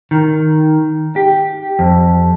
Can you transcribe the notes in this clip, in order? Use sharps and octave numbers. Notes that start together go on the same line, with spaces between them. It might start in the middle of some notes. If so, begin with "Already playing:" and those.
D#3
G4
F2